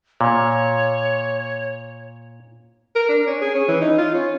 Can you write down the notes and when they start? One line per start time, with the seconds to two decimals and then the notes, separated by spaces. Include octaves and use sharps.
0.21 A#2 C#5
2.96 A#4
3.09 D4
3.27 C#4
3.41 G#4
3.55 C#4
3.68 E3
3.81 D#4
3.98 F4
4.14 C#4